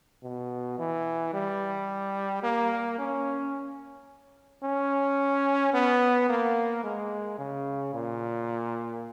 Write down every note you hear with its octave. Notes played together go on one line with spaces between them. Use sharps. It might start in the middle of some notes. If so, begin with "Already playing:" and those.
B2
E3
G3
A#3
C#4
C#4
B3
A#3
G#3
C#3
A#2